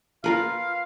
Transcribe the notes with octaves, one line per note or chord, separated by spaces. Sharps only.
F4 A#4 B4 F5